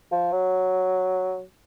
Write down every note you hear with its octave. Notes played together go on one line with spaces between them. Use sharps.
F3
F#3